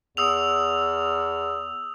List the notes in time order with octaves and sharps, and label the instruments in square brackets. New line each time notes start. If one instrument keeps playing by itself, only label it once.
[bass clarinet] E2 [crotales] D#6 E6 F7